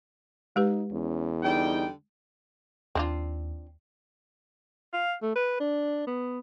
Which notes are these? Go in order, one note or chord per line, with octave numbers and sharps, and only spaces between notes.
G#3 D#4 G4 B4
E2 C#4
D3 G3 D#4 G5
D#2 C4 D4 F4
F5
A3
B4
D4
B3